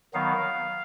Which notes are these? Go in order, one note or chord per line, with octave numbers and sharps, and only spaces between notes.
D#3 F#3 B3 F5